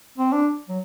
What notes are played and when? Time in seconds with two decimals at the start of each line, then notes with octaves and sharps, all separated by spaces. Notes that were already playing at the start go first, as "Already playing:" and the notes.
0.18 C4
0.32 D4
0.69 F#3